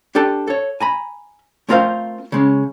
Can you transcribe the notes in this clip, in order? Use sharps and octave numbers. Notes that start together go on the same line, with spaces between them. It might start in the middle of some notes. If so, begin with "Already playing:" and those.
D4 G4 A4
A4 C#5
G#5 A#5 B5
A3 C4 F4 A#4 C5 F5
C#3 G#3 C#4